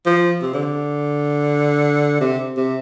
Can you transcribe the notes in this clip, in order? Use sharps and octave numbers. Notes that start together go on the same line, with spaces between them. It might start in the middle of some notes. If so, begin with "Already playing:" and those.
F3
C3
D3
C3
C3